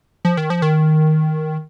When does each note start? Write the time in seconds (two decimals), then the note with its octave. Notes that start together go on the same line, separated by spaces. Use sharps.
0.25 F3
0.37 D#3
0.50 F3
0.62 D#3